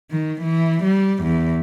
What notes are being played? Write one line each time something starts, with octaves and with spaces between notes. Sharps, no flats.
D#3
E3
G3
E2